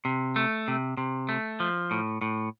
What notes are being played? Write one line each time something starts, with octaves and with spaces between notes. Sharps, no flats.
C3
A3
C3
C3
A3
F3
A2
A2